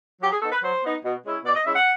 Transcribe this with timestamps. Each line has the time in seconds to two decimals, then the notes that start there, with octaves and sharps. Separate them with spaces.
0.22 F#3 G4
0.32 G#4
0.42 B3 D#4 A4
0.52 B4
0.63 F#3 C5
0.83 B3 D#4
1.04 B2
1.24 G#3 C#4 E4
1.44 B2 D5
1.55 D#5
1.65 G#3 C#4 E4 E5
1.75 F#5